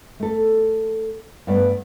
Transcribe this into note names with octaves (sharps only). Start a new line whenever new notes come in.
A3 A4
G2 A3 B3 D5